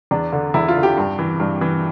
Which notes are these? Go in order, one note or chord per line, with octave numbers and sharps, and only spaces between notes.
E2 D4
D3
E2 E4
F4
D3
G4
G2
E3
G2
E3